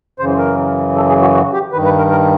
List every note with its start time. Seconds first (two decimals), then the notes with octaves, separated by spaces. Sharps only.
0.19 F#2 C#3 E3 C5
0.38 A#4
0.96 A4
1.09 G#4
1.21 F#4
1.34 F#4
1.53 G4
1.73 D#3 B4
1.75 G2
1.85 B4
1.98 A#4
2.11 A#4